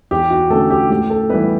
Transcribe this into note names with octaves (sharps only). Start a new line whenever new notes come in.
E2 G4
F#4
D3 A3 C#4 A4
G4
A2 G4
A4
E3 G3 B3 B4